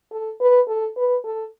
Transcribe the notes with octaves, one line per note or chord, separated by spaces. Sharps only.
A4
B4
A4
B4
A4